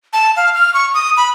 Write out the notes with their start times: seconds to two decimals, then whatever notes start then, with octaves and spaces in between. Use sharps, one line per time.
0.13 A5
0.36 F5
0.55 F6
0.74 C#6
0.94 D#6
1.17 B5